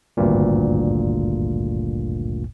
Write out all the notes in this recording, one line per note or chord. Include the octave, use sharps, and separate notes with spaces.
G#1 D2 G2 A#2